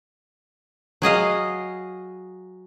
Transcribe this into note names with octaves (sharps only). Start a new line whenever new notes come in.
F#3 G#4 D#5 F5